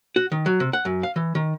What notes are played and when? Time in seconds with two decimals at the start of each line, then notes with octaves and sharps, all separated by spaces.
0.16 F#4
0.32 D#3
0.46 F#3
0.60 C3
0.73 F#5
0.85 F#2
1.03 F5
1.16 E3
1.35 D#3